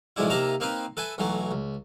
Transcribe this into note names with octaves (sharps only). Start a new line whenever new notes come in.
B1 A2 F3 G#3 D4 E4
C3 A#3 D#4 E5 A5 A#5
A#3 C4 D#4 B4
A4 B4 E5 G#5
B1 E3 F#3 A3
C#2